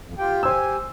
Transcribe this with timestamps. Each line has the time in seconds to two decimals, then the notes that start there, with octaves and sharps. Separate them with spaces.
0.01 F2
0.18 F4 G4 G5
0.43 G4 C5 G#5 E6